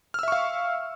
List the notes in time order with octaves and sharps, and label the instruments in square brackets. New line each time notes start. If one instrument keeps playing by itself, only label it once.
[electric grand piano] F6
E6
E5
C#6
F5